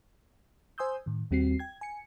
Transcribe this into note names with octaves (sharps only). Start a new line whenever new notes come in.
C5 G#5 C6 D#6 E6 G6
A2 D#3
D#2 G3 C4 F#4 C7
G5 G#6
G#5 C#7